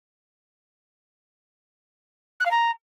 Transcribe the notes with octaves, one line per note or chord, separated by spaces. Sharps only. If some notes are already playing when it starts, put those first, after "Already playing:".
F#6
F5
A#5